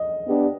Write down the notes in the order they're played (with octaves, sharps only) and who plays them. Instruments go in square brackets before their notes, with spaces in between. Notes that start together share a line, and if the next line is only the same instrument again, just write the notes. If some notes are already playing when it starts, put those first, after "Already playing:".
Already playing: [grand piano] D#5
[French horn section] B3 D4 G4